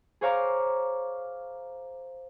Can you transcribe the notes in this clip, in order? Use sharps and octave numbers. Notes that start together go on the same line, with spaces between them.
G#4 C5 C#5 F5 A#5 D6